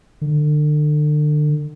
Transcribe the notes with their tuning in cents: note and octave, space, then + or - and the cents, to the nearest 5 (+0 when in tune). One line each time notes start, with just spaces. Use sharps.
D3 +35